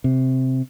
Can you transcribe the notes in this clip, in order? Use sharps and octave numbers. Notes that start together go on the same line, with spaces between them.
C3